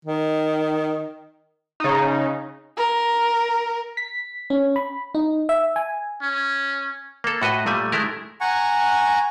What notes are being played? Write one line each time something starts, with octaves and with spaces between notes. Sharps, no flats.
D#3
C#3 D#4
A#4
B6
C#4
B5
D#4
E5
G#5
C#4
A#3 A4
A2 F#4 B4 D#5
A#2 G3 A3 G#5
G#3 A3 E4 A#4
F#5 G#5 A#5 C#6